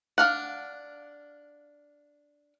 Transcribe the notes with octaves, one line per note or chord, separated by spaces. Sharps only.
D4 F5 F#5